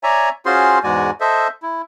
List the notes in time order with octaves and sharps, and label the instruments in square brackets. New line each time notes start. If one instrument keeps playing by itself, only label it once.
[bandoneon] C#5 D5 E5 G#5 A#5
C#4 F4 F#4 G#4 C5 C6
E2 G#2 G#3 F#4 D5 G#5
A4 C5 D#5 E5
E4